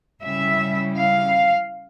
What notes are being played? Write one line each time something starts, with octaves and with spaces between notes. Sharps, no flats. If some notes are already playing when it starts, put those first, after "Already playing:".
C#3 G3 C#4 E4 E5
F5